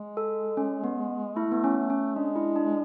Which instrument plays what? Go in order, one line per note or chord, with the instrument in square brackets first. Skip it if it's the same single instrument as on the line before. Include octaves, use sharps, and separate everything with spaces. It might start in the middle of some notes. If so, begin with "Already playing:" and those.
Already playing: [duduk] G#3
[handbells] A4
C#4
B3
[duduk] A3 [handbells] E4
[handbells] B3
C#4
[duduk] A3
[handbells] C#4
[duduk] G#3 [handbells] D4
[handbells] E4
D4